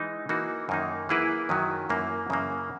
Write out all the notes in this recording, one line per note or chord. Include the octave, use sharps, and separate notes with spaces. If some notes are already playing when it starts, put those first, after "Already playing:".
Already playing: E3 G#3 D#4
E3 A#3 D#4 F#4
F#2 D#3 A#3 D#4
E3 A#3 E4 G#4 B4
F#2 D#3 F#3 C#4
F#2 E3 A#3 E4
F#2 C#3 E3 A#3